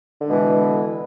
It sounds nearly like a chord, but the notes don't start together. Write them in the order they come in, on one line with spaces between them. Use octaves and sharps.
D3 G#3 B2 E3